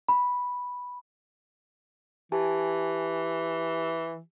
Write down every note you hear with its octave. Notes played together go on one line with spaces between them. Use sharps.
B5
E3 G4 G#5 A5